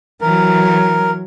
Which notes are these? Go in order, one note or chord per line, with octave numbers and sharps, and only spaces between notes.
E3 F#3 A#4